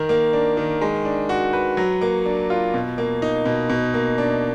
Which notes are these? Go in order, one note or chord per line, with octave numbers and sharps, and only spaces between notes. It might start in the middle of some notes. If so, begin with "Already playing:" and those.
Already playing: D#3 A#4
A#3
D4
D#3
G#3
D4
F#4
B4
F#3
A#3
D4
F4
B2
A#3
D#4
B2
B2
A#3
D4